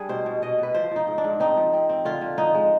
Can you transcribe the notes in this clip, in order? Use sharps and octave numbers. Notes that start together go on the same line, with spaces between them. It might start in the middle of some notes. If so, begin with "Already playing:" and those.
Already playing: G3 D4 G#4
B2 C5
B2
B2 D#5
B2 B4
F3 C5
F3 D#4
G#2
D4
G#2
C4 D#4
F3
C4
C4
D3 F4
D3
F3 D#4
G#3